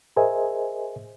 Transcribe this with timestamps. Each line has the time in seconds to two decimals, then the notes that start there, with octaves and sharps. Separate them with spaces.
0.16 G#4 A#4 C5 D#5 E5 G#5